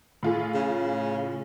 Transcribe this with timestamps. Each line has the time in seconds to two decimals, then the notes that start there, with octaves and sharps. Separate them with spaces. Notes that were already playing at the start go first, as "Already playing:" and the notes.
0.23 A2 F4 G#4
0.54 C#3